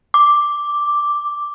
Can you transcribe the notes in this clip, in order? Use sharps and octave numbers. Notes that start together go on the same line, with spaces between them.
D6